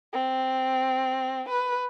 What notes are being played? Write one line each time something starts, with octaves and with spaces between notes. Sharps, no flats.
C4
B4